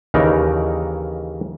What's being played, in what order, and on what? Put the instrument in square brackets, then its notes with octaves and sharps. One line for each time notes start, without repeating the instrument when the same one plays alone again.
[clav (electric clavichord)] D#2 C#3 E3 D#4 A#4 D5